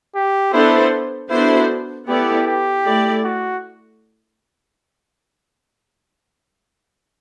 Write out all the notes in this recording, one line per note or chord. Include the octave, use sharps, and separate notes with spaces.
G4
B3 D4 E4 A4 C5
B3 D4 E4 F#4 A4 C5
B3 E4 G4 A4 D5
G4
A3 E4 A4 D5
F#4